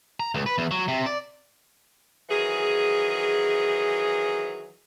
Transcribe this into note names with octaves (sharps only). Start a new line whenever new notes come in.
A#5
C#2
B4
E2
F#3
C3
D5
D#3 E3 F#3 G#4